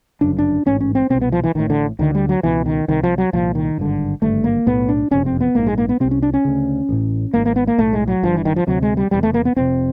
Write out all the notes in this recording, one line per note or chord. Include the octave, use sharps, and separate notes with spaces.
G1 F#2 C#3 D4
D4
A1 G#2 C#4
C#4
C4
C2 B2 C4
B3
F3
E3
A1 A2 D#3
D3
D2 D3 D#3
G3
F#3
C#2 B2 E3
D#3
C2 C3 D#3
F3
F#3
C2 A#2 F3
D#3
G#1 G2 D3
G#1 G2 D3 A3
A#3
B1 A2 B3
D4
F#1 F2 C3 C#4
C4
B3
A#1 G#2 A#3
G#3
A#3
B3
C2 C3 C4
C#4
D4
C#4
D2 C#3
A1 A2
G#1 G#2 A#3
A#3
B3
A#3
B1 A2 A3
G#3
F#3
G1 G2 D3 F3
E3
D#3
F3
D2 C3 F#3
G#3
G3
E1 E2 C3 G3
A3
A#3
B3
F1 F2 C3 C4